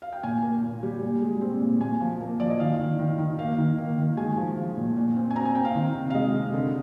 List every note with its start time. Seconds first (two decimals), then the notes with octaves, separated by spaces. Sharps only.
0.02 F5
0.13 G5
0.23 A#2 G#5
0.42 A#3
0.63 A#2
0.83 G3
1.02 A#2
1.22 G#3
1.41 C4
1.61 A#2
1.81 A#2 G#5
2.00 F3
2.20 A#3
2.40 F3 D5
2.50 D#5
2.60 D#3 F5
2.80 D#3
2.99 D#3
3.18 D#3
3.39 A#3 F5
3.58 D#3
3.78 A#3
3.98 D#3
4.17 G#3 G#5
4.37 F3
4.57 F3
4.77 A#2
4.96 A#2
5.16 C4
5.30 G#5
5.36 C4 A#5
5.45 G#5
5.55 C4 G5
5.65 F5
5.75 D#3
5.95 C3
6.10 F5
6.14 G#3 D#5
6.34 C3
6.54 D3